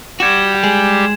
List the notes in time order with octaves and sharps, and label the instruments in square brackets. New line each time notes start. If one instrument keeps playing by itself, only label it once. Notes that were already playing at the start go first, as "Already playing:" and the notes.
[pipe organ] G3 G4 [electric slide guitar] F#4 [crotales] G#6 E7
[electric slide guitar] G#3 G#4